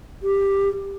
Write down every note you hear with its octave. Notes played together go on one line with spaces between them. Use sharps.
G4